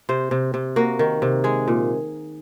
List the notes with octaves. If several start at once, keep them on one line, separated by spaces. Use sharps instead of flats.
C3 C5
C3
C3
A#3 F#4
D#3
C3
G#3 G#4
A#2